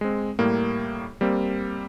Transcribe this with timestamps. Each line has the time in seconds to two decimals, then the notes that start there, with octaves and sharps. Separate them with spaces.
0.01 G#3 C4
0.39 A2 G3 A#3
1.21 G3 A#3 C4